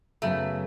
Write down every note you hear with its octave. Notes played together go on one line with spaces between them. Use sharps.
F#2 C#3 F#3 A3 B3